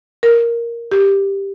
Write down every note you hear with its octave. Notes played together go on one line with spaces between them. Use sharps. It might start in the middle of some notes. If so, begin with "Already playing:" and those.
A#4
G4